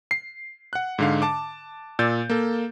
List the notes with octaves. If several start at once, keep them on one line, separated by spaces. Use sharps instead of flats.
C7
F#5 F#6
G#2 D3 F5
A5 D6
A#2 D5 E6 G6 A6
A#3 A4